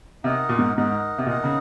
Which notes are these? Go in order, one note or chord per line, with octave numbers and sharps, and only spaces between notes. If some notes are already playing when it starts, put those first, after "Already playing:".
C3 D#4 A#4 D#5 F#5
A#2
G#2
G#2 D#4 A#4 D#5 F#5
C3
A#2 D#4 A#4 D#5 F#5
C#3